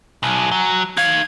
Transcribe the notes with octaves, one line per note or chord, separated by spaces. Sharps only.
B1 G#5
F#3
D#4 F5 G#6